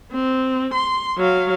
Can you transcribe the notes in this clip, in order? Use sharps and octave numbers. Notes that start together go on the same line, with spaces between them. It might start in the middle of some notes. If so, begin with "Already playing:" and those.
C4
C6
F#3 F5